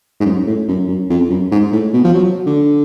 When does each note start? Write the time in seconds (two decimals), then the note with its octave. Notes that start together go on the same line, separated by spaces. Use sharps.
0.20 G#2
0.25 F#2
0.47 A2
0.68 F#2
0.88 F#2
1.10 F2
1.30 F#2
1.51 G#2
1.72 A2
1.93 B2
2.04 F3
2.14 F#3
2.46 D3